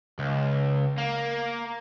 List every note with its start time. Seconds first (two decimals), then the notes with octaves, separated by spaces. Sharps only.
0.19 C#2
0.98 A#3